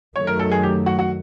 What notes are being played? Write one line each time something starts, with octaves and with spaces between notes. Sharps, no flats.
F#2 D#3 F#3 A3 C#5
A#4
A4
G#4
G4
F#4
F#4